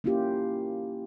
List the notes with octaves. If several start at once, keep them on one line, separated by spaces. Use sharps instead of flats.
A#3 C#4 E4 F4 G4